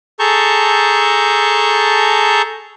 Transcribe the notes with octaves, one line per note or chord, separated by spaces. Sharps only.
G#4 A4 A5 A#5 C#6 G6